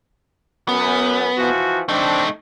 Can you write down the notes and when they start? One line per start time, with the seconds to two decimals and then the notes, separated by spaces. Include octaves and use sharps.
0.69 F#2 B3
1.38 E3 F3 F#4
1.89 A3 C4 D4 D#4